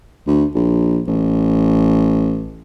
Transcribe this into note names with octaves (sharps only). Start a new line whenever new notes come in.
D2
A#1
A1